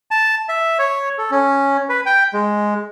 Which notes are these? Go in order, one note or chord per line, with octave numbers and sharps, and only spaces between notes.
A5
E5
C#5
A4
C#4
B4
G5
G#3